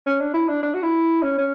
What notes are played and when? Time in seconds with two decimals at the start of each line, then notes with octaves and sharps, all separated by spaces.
0.06 C#4
0.20 D4
0.34 E4
0.48 D4
0.63 D4
0.74 F#4
0.82 E4
1.22 C#4
1.38 C#4